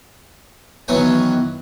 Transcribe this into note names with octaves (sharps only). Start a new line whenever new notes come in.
D#3 E3 F#3 B3 C#5 G#5